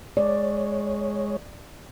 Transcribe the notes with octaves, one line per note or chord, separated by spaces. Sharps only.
G#3 C#5 D5